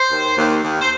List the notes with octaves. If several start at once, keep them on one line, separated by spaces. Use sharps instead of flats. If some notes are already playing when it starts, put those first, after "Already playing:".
Already playing: C5
D#2
D#2
D#2
C5